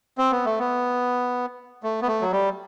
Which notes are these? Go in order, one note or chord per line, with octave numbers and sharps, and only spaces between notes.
C4
B3
A3
B3
A3
B3
A3
F#3
G3